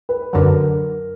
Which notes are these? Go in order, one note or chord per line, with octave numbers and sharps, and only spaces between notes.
B4
F#2 D3 F#3 A#4